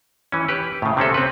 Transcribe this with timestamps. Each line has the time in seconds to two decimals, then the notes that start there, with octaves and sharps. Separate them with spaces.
0.32 E3 C#4
0.49 G4 B4
0.82 A2 C#3
0.97 C3 C4 C#4 A4
1.14 C4 B4